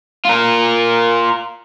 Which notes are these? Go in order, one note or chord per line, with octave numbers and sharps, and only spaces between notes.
F4 A#4